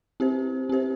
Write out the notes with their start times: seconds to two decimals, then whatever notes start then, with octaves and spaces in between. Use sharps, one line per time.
0.20 C4 G4 C5
0.69 C4 G4 C5